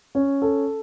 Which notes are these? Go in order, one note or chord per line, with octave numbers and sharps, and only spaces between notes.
C#4
A4